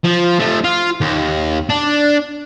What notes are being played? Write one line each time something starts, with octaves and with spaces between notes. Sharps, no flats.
F3
F3 A3
F4
D#2
D4